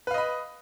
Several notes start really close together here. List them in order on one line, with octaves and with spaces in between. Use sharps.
B4 F5 D#5 B5